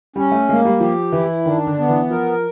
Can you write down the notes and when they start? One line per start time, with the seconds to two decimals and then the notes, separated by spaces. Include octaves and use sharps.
0.16 G3 C#4
0.32 A3
0.49 G#3 A#3
0.65 G3
0.80 F3 G4
1.12 E3 E4
1.45 D#3 D4
1.67 D3
1.78 B3
1.89 E3
2.10 F3 A#4